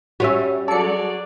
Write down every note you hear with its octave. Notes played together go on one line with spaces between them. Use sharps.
G3 C#4 F#4 E5
F#3 G#4 A4 D5 C#7